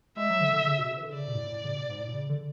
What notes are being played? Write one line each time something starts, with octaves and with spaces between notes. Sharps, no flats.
G#3 E5
F#3
D3
D3
C#3
B2
C#3
E3
D3
C#3 D5
B2
G#2
A2
A2
C#3
B2
G#2
A2
B2
C#3
D3